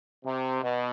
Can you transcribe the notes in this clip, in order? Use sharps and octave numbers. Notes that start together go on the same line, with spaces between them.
C3
B2